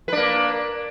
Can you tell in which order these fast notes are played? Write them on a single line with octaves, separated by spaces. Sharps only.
B4 D4 A#3